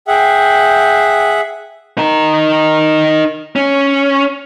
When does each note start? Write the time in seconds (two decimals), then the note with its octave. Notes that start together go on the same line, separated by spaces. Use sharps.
0.07 G#4 E5 F#5 G5
1.98 D#4 A#4
3.56 C#4